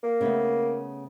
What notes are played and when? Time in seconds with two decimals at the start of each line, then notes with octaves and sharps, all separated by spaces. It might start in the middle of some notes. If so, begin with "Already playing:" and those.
0.03 A#3
0.21 C#3 A3 B3